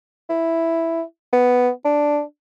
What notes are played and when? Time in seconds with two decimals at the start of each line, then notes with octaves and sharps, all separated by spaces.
0.29 E4
1.33 B3
1.85 D4